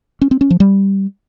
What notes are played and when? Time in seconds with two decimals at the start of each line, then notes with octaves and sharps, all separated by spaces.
0.21 C#4
0.31 C4
0.41 C#4
0.50 F3
0.60 G3